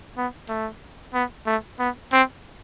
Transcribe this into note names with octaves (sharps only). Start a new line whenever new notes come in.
B3
A3
B3
A3
B3
C4